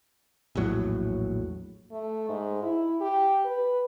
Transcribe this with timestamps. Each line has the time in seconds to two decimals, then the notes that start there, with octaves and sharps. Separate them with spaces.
0.55 A#1 E2 A2 F#3
1.91 A3
2.29 G#2
2.62 E4
3.01 G4
3.45 B4